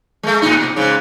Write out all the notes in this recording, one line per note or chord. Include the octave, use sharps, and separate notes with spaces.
G#3 A3
A2 D#4
B2
G#2 C#3